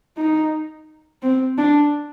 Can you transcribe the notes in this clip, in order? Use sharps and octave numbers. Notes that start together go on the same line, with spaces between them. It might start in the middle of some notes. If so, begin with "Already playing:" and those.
D#4
C4
D4